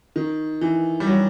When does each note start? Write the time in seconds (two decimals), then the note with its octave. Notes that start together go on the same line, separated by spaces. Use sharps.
0.16 D#3
0.61 E3
1.00 G3
1.07 F#3